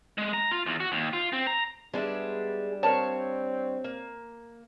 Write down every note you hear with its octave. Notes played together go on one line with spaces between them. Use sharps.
G#3
A#5
F4
E2
F#4
D#2
F4
C4
A#5
G3 G#3 B3 D4 G#4 E5
C4 A#4 C#5 F5 A5
A#3